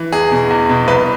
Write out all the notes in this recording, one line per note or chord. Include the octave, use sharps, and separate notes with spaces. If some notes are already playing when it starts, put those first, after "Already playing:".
Already playing: E3
E2 G#4
B2
E2
B2
C2 B4